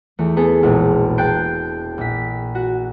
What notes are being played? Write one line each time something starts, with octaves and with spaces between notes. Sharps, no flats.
E2 A3
B3 G#4 A4
E1 A#1 B2
G5 A5 F#6 G6 C7 D7
A#1 B6
F#4